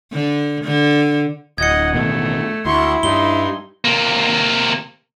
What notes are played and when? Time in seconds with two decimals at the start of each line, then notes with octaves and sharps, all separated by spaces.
0.13 D3
0.64 D3
1.58 D1 D#5 F#5 G#6 C#7
1.94 A1 B2 D#3 A3
2.65 D2 E4 C6 C#6
3.03 G2 G3 D#4 C6 G7
3.85 C3 A#3